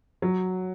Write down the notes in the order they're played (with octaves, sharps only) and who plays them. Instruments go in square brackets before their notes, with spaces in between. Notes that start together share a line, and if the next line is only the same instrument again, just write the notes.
[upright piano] F#3